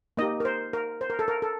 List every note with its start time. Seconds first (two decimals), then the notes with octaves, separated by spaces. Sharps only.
0.17 A#3 D#4 G4 D#5
0.40 A#4
0.45 C5
0.73 A#4
1.01 C5
1.10 A#4
1.19 A4
1.28 A#4
1.42 A4